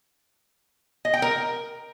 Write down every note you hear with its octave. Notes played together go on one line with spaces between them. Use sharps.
D#5
G5
A#4